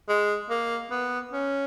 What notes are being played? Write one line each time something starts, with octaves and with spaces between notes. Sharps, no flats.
G#3
A#3
B3
C#4